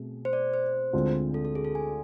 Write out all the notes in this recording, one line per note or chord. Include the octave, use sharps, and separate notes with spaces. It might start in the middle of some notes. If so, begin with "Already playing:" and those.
Already playing: B2 A3 C4 G#4
C5
D5
C5
D2 D3 G#3 C4 F4
A4
A4
G#4
A4
G#5